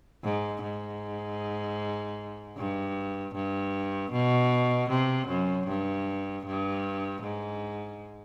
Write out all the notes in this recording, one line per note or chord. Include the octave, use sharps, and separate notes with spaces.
G#2
G#2
G2
G2
B2
C3
F#2
G2
G2
G#2